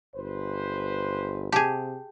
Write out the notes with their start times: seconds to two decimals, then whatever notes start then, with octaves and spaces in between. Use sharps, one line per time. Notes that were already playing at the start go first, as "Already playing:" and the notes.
0.16 G1 B4 C5
1.52 C3 G4 G#4 A5